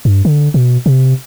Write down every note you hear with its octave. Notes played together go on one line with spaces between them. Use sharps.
G2
D3
B2
C3